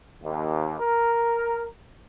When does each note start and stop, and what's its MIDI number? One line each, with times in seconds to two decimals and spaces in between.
0.22 0.79 39
0.80 1.66 70